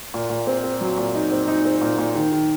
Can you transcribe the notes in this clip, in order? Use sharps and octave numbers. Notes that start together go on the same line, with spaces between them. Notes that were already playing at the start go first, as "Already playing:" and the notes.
A#2
A#2
C4
C4
F#3
A#2
D#4
C4
D#4
C4
A#2
A#2
D#3
D#3